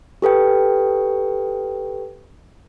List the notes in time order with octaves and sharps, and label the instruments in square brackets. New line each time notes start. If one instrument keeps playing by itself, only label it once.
[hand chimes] G4 A4 B4 G5